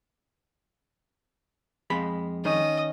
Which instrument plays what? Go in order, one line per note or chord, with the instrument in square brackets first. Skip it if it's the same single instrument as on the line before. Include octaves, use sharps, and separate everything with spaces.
[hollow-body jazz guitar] F2 G#3 B5
[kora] D#3 C#4 [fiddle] D#5